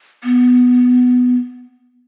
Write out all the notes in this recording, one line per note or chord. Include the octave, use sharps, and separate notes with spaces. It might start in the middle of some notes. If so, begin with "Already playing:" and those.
B3